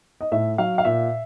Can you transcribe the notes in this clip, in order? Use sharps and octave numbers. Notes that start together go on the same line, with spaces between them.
D#5
A2 E5
F#3 F5
F5
A#2 E5